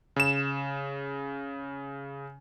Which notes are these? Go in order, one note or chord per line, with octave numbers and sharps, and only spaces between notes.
C#3 E7